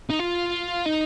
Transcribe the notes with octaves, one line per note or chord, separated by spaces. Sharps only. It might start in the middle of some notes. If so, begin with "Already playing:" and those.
D#4
F4
D#4